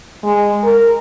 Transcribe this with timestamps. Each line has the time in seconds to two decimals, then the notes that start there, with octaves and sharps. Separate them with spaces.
0.24 G#3
0.64 A#4